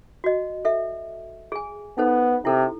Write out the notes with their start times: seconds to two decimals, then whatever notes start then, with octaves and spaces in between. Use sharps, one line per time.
0.24 F#4 D#5
0.65 A4 E5
1.52 G#4 G#5
1.98 B3 D#4 A4 C5
2.45 C3 E4 A4